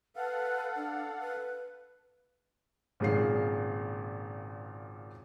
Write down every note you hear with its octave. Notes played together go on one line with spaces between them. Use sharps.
A4 B4 F5 F#5
D4
B4
G#1 A#2 C#3 G#3 C7